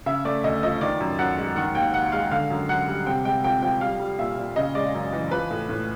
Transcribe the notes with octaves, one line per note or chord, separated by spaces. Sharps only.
C#3 E5
A3 D5
D2 D#5
F3 D#5
D#3 D5
F#2
F#2 F#5
G#3
D#3 F#5
D#2 G5
D#2 F#5
G#3 F5
D3 F5
F#2
F#2 F#5
G3
C3 G5
G#3 G5
F2 G5
F3 G5
G3 F5
G3
A#2 E5
A#2
C#3 D#5
G#3 D5
F#2
E3
F3 B4
A2
A2